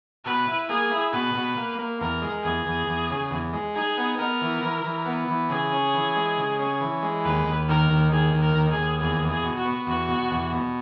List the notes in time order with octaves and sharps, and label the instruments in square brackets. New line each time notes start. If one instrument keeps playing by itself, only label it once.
[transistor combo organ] B2 [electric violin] B4
[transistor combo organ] E4
[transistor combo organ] A#3 [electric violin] G#4
[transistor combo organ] E4
[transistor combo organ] B2 [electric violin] B4
[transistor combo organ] B2
A#3
A#3
[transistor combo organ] E2 [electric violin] A#4
[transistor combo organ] G#3
[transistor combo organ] E2 [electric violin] G#4
[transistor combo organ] E2
E2
C#3
E2
G#3
[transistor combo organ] D#4 [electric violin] G#4
[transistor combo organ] B3
[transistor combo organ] B3 [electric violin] A#4
[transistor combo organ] E3
E3
E3
B3
E3
[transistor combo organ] C#3 [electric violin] G#4
[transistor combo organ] C#4
E3
G#3
C#3
C#4
E3
G#3
[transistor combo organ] D#2 [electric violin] B4
[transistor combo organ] D#2
[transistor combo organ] D#3 [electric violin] A#4
[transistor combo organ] D#2
[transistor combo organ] D#3 [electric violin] G#4
[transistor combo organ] D#2
[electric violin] A#4
[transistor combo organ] D#2
[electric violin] G#4
[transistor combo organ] D#2
[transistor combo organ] E2 [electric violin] G#4
[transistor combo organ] E2
[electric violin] G#4
[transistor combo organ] B2
[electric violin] F#4
[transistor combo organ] B3
[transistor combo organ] E2 [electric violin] F#4
[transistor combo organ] B2
E2
B2